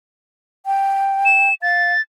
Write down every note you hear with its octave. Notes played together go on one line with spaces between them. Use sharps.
G5
E7
F5 A6